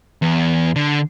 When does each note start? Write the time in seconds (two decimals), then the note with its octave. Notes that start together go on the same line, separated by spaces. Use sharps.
0.22 E2
0.76 D3